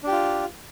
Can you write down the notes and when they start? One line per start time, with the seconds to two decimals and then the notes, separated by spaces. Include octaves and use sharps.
0.03 D4
0.08 G4
0.12 F4